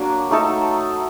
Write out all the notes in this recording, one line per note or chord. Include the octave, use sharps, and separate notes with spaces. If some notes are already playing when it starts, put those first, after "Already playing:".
Already playing: F#3 A#3 D4
A3 D#4 A4